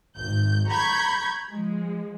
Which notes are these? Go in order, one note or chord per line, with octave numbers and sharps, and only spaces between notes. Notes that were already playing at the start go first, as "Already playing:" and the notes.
G#1 G6
A#5 B5 C#6 G6 G#6 B6
F3 G#3